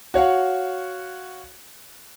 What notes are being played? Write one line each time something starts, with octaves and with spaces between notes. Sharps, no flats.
F#4 C#5 F5 F#5